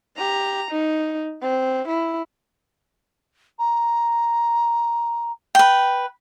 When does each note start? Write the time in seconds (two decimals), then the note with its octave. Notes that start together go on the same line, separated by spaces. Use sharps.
0.17 G4 A#5
0.71 D#4
1.42 C4
1.88 E4
3.59 A#5
5.55 B4 G5